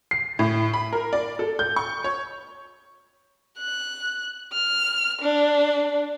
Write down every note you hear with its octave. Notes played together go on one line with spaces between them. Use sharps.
C7
A2
B5
A#4
D5
A4
G6
C#6
C#5
F#6
F6
D4